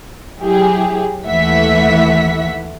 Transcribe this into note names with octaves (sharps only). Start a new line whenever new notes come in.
F#3 E4 G4 G#4
D#2 E3 A3 E5 F#5 B6